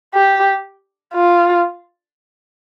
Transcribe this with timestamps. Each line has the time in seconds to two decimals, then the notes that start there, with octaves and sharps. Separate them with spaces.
0.15 G4
1.14 F4